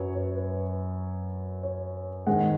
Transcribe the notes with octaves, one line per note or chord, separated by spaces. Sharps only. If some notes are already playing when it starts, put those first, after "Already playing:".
Already playing: F#2 F#3 B4 C#5
C#5
B4
C#5
G#2 D#3 G#3 F#5